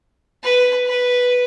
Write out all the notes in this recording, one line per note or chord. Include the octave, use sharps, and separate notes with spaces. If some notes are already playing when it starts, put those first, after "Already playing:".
B4
B4